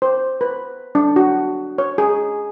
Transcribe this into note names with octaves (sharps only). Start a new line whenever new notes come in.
C5
B4
D4
F#4
C#5
G#4